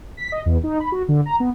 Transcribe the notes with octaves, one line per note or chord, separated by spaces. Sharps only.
B6
D#5
E2
D#4
B5
F#4
D3
A#5
B3